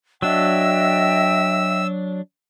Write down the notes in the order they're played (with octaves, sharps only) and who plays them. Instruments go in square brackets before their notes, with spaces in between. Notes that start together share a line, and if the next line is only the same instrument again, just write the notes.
[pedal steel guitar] F#3 D4 [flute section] D#5 E5 G5 [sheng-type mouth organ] E6